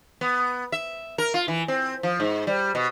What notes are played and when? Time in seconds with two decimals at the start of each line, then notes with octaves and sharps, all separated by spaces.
0.21 B3
0.72 E5
1.18 A#4
1.34 F4
1.48 E3
1.68 C4
2.03 F3
2.20 G#2
2.47 G3
2.75 B2